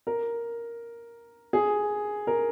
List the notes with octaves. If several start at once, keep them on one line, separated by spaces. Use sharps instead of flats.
A#4
G#4
A#4